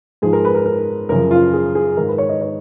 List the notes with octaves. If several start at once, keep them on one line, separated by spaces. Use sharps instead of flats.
G#2 F3 G#4
A#4
B4
A#4
A#4
F#2 C#3 F3 A#4
F4
G#4
G#4
G#2 D#3 A#4
B4
C#5
D#5
C#5